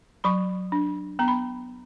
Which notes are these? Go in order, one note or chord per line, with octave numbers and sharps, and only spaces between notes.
F#3 B5 C#6
D4
B3 A#5
B5